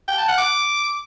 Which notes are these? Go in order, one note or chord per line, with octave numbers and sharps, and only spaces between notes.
G5
A5
F#5
D6